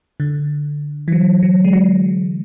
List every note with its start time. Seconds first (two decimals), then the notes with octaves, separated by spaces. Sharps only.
0.20 D3
1.08 E3
1.12 F#3
1.43 F#3
1.65 G#3
1.73 F#3